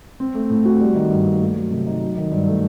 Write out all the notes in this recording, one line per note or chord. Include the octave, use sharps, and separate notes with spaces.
C4
A3
A2
F#4
G3
D#3
G2
A#3
A3
F#3
C3
D#4
F#3
D#3
G2
A3